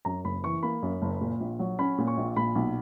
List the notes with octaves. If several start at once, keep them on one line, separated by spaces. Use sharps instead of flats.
F#2 A#5
F#1 B5
E3 C#6
A#3 B5
F#2
F#1
A#2
A#1
F#3
C#4 B5
A#2
C#6
A#1
A#2 B5
B1